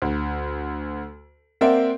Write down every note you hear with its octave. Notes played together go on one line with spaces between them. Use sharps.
D2
A#3 C4 A#4 D5 E5 F#5